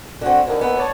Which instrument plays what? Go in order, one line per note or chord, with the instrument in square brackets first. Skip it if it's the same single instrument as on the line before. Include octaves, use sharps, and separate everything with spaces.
[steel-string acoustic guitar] D3 C4 [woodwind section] F#4
[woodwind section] D#2 [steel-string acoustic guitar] D3
[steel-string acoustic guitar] B3
[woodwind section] C#5 D5 A5